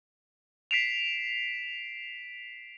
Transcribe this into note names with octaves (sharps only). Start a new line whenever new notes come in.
B6 C7 D7 E7 F7